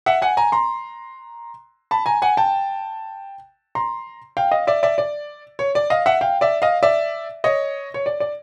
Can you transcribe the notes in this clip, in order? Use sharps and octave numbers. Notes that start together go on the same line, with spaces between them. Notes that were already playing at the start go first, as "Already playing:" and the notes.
E5 F#5
F#5 G#5
G#5 A#5
A#5 C6
A5 B5
G#5 A#5
F#5 G#5
G5 A5
A#5 C6
F5 G5
D#5 F5
D5 E5
D5 E5
D5
C#5
D5
D#5 F5
E5 F#5
F5 G5
D5 E5
D#5 F5
D5 E5
C#5 D#5
C#5
D5
D5